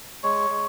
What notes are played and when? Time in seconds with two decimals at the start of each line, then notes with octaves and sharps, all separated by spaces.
0.23 G#3 C#5
0.50 G#3